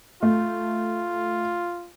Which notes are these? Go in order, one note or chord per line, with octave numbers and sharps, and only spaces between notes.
A3 F4